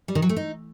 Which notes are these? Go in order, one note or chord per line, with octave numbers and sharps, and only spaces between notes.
G3
D#3
F#3
A3
D#4